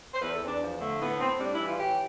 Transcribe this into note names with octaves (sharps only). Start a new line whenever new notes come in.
C5
E2 B4
A4
E2 C4
D4
F3
D3 A3
A2 B3
A2 C4
G3 D4
E4
E3
F4
A2 G4